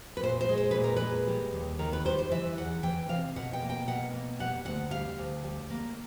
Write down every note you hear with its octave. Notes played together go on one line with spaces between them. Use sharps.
B4
A#2 C5
C5
G#3
C5
A#2 B4
A#4
G#3 B4
G3
D#2
D#3 A#4
B4
G3 C5
C5
E3 E5
E2 F#5
E3 G5
C3 F5
B2 F#5
G5
A#3
G5
B2 F#5
A#3
G3 F#5
D2 F#5
G3 F5
D2
G3
A#3